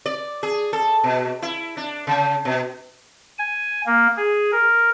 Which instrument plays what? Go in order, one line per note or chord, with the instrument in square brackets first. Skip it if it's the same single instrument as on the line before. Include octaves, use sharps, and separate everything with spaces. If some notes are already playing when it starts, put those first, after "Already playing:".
[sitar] D5
G#4
A4
B2
E4
D4
C#3
B2
[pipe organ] G#5
A#3
G#4
A#4